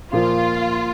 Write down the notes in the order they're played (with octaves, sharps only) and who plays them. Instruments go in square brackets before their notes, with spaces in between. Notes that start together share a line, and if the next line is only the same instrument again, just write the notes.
[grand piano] A#2 F3 A#3 [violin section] F4